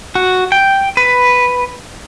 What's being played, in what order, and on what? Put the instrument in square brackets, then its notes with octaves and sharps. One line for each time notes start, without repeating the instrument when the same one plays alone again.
[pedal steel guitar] F#4
G5
B4